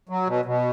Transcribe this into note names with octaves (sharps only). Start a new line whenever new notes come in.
F#3
B2
B2